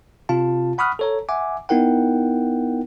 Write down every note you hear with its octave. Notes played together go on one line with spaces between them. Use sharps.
C3 F4 F5 A5
F#5 B5 C#6 D#6 F6 F#6
A4 C#5 A#5
E5 F#5 G#5 D6
B3 D#4 E4 A#4 F#5 G5